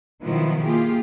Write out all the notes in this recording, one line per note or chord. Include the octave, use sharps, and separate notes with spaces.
B2 D#3 F3 F#3 B3 E4
A#3 F4 G4 G#4